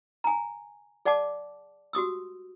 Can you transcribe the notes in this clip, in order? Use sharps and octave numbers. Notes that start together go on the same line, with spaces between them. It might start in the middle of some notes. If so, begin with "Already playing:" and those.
G#5 A#5
G#4 D5 F#5 A5 D6
F#4 G4 D#6 E6